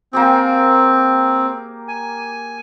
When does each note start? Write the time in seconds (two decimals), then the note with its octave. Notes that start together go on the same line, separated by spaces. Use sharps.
0.13 A#3 C4 G4 G#4
1.88 G#5